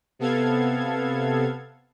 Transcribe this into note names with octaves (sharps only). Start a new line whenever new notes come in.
C3 B3 A4 F5 G#6